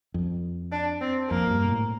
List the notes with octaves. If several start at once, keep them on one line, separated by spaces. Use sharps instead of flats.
F2
D4
C4
F2 A#3
G2
A#2
A2